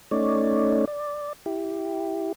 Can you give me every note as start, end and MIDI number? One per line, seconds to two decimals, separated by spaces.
0.11 0.85 57
0.11 0.85 61
0.11 0.85 63
0.11 0.85 73
0.11 0.85 74
0.87 1.33 74
1.46 2.33 64
1.46 2.33 67